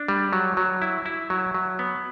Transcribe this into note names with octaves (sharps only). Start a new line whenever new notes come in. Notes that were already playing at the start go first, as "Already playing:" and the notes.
Already playing: D4
G3
F#3
F#3
E4
E4
F#3
F#3
B3